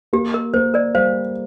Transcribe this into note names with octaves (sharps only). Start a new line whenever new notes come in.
A#3 G4
A#4
A#3 C5
A#4 D5
G3 C5 F5